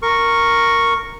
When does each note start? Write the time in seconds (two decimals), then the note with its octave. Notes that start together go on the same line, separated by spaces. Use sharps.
0.02 A#4 C#6